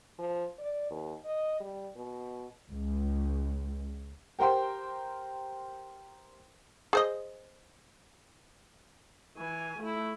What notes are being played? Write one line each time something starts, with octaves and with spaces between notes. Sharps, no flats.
F3
D5
D#2
D#5
G3
B2
C#2
G4 A#4 C5 G5 C6
G#4 C5 D#5
E3 G#5
A3 E4